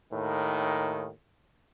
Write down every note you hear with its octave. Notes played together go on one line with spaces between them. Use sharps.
D#2 A2 D#3